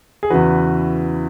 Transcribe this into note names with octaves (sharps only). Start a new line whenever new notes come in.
G#4
E2 C#3 E3 F#4 B4